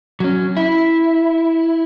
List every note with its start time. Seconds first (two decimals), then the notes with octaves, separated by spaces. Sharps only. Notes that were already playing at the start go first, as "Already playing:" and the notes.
0.20 F#3 C#4
0.57 E4